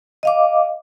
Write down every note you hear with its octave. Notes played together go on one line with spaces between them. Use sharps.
D#5 F5 D6